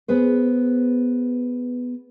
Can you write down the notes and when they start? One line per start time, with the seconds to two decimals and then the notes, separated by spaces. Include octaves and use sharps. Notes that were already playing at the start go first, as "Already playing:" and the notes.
0.08 B3 G#4 B4 C5